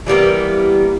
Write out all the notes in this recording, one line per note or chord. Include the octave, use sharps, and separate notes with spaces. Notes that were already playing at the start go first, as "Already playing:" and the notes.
E3 G3 A#3 B3